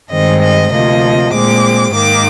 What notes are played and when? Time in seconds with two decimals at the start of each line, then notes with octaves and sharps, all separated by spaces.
0.11 G2 D#3 G#3 C4 D#5
0.42 D#5
0.72 D2 C3 F3 A#3 D#5
1.33 A#2 G#3 C4 D6
1.94 G#2 D#3 A#3 D6